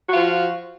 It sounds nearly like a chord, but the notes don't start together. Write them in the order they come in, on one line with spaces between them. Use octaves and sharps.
F#4 F4 F3